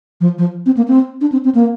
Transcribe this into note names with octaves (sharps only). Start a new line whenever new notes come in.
F3
F3
C4
A#3
C4
D4
C4
C4
A#3